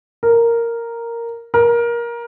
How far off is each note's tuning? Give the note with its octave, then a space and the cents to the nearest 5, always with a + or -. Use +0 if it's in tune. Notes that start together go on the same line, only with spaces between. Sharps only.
A#4 -5
A#4 +20